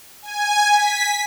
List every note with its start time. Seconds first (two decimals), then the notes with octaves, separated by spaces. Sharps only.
0.22 G#5
0.72 B6